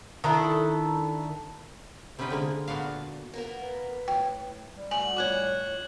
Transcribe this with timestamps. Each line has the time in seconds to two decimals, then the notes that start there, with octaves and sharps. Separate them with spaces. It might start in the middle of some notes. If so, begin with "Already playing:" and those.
0.24 D#3 D4 E4 A4
2.19 C3 B3 C#4 D#4 B4 G5
2.30 D3 G#3 A#3
2.68 A#2 B3 D4 F#4 F5
3.34 A#3 B3 A#4
3.61 B4
4.08 A2 G5
4.75 G3
4.91 A3 F#4 G#5 F#7
5.17 F2 A2 C#5 D6 F#6 G#6